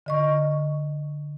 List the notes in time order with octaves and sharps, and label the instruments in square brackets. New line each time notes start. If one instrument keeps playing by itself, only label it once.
[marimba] D3 D#5 C#6